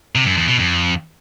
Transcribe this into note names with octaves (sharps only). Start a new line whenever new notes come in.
C3
F#2
E2
B2
F2